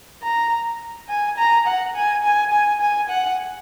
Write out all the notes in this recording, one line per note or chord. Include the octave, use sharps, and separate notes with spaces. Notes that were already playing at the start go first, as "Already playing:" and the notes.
A#5
G#5
A#5
F#5
G#5
G#5
G#5
G#5
F#5